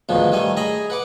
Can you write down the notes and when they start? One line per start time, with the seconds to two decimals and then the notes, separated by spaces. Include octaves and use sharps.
0.09 D2 G#2 B2 D3 D#3 F3
0.31 A1 D#3 G3 A3 G#5
0.57 G#4 D#5 G#5 A#5 B5
0.90 B4 F#5 D6